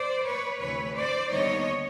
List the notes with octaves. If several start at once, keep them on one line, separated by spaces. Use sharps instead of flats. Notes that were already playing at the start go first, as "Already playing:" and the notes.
Already playing: C5 D5
B4 C#5
D2 C3 E3 A3 B4 C#5
C5 D5
D#2 D3 G3 B3 D#4 C#5 D#5